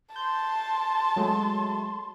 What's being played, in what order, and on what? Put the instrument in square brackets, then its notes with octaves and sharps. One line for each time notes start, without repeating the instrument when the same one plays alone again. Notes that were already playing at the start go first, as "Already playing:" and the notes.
[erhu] A5 [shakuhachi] C6 [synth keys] G6
[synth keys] F#3 G#3 A3